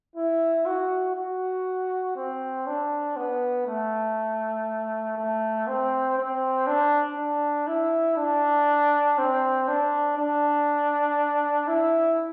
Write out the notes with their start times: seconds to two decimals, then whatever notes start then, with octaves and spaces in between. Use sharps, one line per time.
0.16 E4
0.66 F#4
1.15 F#4
2.16 C4
2.67 D4
3.16 B3
3.66 A3
5.17 A3
5.67 C4
6.18 C4
6.67 D4
7.17 D4
7.67 E4
8.17 D4
9.18 C4
9.68 D4
10.18 D4
11.68 E4